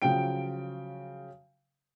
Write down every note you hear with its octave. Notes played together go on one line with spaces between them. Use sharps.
C#3 F3 F#3 G5 D7